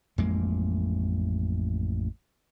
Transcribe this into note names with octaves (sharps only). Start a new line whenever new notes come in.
A1 F2 G#3 A#3